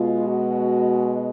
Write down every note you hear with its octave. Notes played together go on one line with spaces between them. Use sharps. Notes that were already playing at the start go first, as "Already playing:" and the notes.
Already playing: B2 G#3 F4
F#4